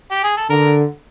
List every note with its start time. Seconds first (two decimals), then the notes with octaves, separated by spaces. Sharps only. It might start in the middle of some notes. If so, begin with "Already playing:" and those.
0.11 G4
0.24 G#4
0.37 A4
0.50 D3 A#4